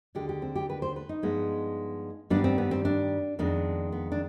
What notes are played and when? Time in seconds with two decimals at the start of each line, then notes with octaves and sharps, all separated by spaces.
0.15 D#2 D3 G#3 G4
0.29 G4
0.42 C4
0.56 G4
0.70 B4
0.82 C5
0.96 B4
1.09 D#4
1.22 G2 F3 G#3 B3
2.30 G2 D#3 G3 B3 D4
2.44 C4
2.58 B3
2.71 C4
2.85 D4
3.39 F2 D#3 G#3 B3 D4
3.92 B3
4.12 D4